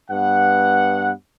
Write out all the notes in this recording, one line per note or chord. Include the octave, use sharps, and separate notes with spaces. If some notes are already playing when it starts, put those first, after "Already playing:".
G2 B3 F#5